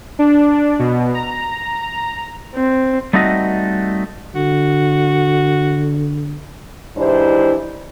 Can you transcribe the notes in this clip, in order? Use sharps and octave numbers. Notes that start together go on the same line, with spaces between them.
D4
B2
A#5
C4
G3 A3 C4 D#4 F#4 D#5
D3 F#4
G#2 E3 D4 E4 G4 C5